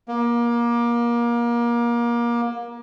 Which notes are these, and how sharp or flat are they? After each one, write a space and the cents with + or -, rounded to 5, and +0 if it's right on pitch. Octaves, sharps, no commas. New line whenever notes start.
A#3 +25